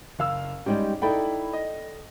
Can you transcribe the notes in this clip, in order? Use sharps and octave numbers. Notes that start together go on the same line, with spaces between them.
F#1 F5 E6
G#2 G3 G#3 C#4 G4
D#4 E4 A4 D5 G5 B5
D#5